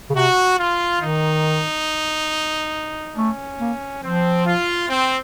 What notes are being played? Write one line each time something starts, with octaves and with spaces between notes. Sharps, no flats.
C#3
C3 F#4
F4
D#3 D#4
A3 C#4
A#3
F3 C4
F4
C4